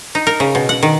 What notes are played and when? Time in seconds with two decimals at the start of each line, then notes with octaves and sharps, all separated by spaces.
0.15 D#4
0.27 A#4
0.40 C#3
0.55 B2
0.69 F#5
0.83 D#3